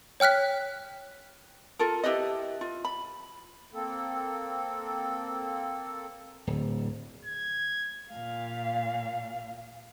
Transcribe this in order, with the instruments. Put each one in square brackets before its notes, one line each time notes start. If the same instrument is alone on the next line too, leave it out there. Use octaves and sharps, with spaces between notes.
[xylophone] C#5 G5 F6 F#6 B6
[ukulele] F4 A4 A#4
E4 G4 B4 D#5
F4
B5
[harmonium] A#3 C4 A4
[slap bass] D1
[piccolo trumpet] G#6
[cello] A#2 F5